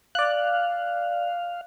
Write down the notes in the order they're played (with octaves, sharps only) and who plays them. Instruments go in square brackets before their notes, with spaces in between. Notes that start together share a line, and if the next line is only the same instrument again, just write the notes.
[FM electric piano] D5 F#6 [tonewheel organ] F5